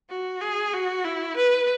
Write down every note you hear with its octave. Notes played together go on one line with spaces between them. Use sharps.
F#4
G#4
F#4
E4
B4